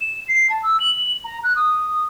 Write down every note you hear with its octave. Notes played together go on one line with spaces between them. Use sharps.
E7
C7
A5
E6
F#7
A#5
F#6
D#6